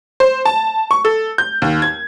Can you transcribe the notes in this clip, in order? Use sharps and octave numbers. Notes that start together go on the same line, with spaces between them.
C5
A5
C#6
A4
G6
D#2
G#6